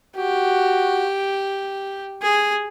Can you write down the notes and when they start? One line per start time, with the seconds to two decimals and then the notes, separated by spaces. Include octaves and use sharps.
0.16 F#4 G4
2.22 G#4